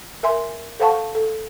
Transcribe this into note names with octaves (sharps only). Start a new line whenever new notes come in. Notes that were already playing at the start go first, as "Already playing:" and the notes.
A#4 E5 G#5 C6
A4 C5 F5 F#5 A5 C#6
A4